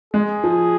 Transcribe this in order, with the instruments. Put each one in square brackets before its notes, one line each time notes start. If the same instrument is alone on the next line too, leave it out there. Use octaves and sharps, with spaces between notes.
[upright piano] G#3 [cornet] G#4
[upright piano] F3